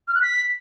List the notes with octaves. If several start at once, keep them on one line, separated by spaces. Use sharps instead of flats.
F6
F#6
B6